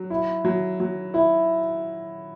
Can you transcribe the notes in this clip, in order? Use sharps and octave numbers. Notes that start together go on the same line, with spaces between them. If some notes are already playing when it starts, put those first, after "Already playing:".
Already playing: F#3
E4
F#3
F#3
E4